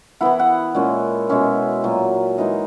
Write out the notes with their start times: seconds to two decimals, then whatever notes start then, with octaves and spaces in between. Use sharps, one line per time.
0.21 E3 B3 E4 F#5
0.39 F#5
0.75 A#2 G#3 C#4
1.29 B2 G#3 C#4 E5
1.84 A#2 F#3 A#3
2.38 E3 G#3 D#4 D#5